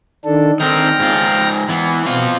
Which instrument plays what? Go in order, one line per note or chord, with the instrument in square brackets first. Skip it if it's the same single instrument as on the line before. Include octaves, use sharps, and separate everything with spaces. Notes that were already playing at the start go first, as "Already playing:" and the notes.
[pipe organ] D#3 D4 A4
[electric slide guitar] D#3 C4 [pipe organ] G5 F6 A#6
[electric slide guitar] G#2 F4
E3 B3
[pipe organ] B2 [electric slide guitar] C4 F4